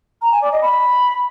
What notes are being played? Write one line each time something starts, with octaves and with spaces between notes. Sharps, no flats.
A#5
G#5
D5
D#5
B5